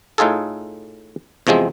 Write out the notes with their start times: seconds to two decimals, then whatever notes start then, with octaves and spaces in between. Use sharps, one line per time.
0.18 A2 D#4 F4 G#4 A4
1.47 E2 C3 F3 G#3 C4